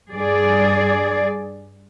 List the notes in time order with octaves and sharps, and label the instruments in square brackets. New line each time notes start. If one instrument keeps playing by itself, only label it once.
[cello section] G2 G#4 D5